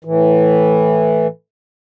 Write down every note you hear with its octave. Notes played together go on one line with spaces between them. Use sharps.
A2 E3